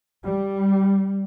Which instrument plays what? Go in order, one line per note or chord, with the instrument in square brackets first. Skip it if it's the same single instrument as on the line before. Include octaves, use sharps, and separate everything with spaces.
[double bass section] G3